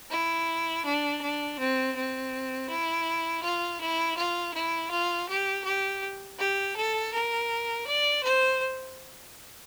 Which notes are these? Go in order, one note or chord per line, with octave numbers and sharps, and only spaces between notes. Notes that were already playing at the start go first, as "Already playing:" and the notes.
E4
D4
D4
C4
C4
E4
F4
E4
F4
E4
F4
G4
G4
G4
A4
A#4
D5
C5